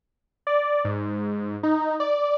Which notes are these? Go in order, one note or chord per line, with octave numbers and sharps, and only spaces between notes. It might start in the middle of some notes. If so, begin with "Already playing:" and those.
D5
G#2
D#4
D5